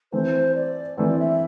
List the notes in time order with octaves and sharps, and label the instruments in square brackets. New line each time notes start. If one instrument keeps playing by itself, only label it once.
[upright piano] E3 A3 C4 [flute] C5
[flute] D5
[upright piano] E3 A3 C4 [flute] D5
[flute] E5